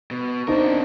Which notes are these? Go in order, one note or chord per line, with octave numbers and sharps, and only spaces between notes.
B2
C4 D4 D#4 A#4 C5